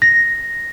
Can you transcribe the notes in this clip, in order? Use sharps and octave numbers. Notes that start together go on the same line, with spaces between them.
A#6